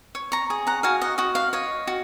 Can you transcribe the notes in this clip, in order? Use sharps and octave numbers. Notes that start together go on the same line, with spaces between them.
C#5
A#5 C#6
G#4
F#5 A#5
F#4 F5 G#5
D#5 F#5
F#4 D#5
F5
C#5 D#5
F#4